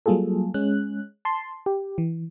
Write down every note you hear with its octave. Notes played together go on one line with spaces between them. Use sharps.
F#3 G3 A#3 F4 G#4 A4
G#3 C#4 F#6
A5 C6
G4
E3